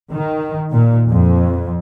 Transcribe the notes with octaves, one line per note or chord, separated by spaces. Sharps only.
D#3
A#2
F2